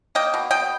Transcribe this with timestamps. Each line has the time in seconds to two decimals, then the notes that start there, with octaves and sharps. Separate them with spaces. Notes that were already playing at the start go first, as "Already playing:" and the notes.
0.15 A#3 D#5 G5
0.34 B2
0.51 B2 D#5 G5